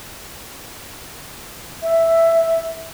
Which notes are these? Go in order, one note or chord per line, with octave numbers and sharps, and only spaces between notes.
E5